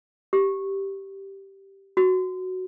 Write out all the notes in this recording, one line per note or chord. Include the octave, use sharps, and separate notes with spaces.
G4
F#4